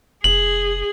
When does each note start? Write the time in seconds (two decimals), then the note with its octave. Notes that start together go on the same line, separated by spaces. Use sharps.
0.24 F1 G#4 F#7